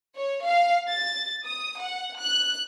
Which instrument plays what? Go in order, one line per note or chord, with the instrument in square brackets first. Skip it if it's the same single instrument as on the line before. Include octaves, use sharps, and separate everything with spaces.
[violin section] C#5
F5
A6
D#6
F#5
F#6